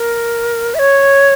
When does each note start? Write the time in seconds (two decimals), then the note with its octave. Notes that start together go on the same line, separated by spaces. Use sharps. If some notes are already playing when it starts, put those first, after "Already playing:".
Already playing: A#4
0.75 E5
0.79 C#5